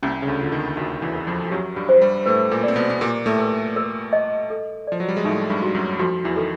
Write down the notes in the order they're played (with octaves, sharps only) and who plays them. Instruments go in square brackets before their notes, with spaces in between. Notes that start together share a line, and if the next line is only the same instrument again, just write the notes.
[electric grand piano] C2 C3 [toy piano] C#4
[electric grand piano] C#3
D2 D3
[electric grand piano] D3 [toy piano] F4
[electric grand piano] D#2 D#3
[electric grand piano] D#2 D#3 [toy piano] F#4
[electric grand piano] E2 E3
[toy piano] A#4
[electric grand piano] F2 F3
F3
[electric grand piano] F#2 F#3 [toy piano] G4
[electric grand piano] G2 G3
[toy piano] C5
[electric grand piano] G2 G3
[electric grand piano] A2 A3 [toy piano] B4
[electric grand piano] A#2 A#3
[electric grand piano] C4 [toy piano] D5
[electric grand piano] B2 B3
B3
[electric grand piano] A#2 A#3 [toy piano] G4
[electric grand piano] A2 A3
[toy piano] B4
A#4
D#5
A4
[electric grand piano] F3 [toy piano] D5
[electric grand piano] F#3
G3
G#3
[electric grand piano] A2 A3 [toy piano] D#4
[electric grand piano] G2 G3
[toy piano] F#4
[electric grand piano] F#2 F#3
[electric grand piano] F2 F3 [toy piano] F#4
[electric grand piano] E2 E3
[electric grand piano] D#3 [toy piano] A4